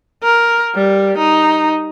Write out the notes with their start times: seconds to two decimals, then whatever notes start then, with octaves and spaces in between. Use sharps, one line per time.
0.23 A#4
0.75 G3
1.18 D#4